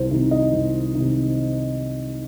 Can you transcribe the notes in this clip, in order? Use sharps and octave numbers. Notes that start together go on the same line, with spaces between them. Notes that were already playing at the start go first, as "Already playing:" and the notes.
Already playing: C2 C5
C3 D#3
D#5
C2
C3 D#3